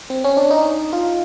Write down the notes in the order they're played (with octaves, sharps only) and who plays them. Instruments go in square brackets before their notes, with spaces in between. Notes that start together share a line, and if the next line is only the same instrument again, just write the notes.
[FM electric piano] C4
C#4
D4
D#4
F4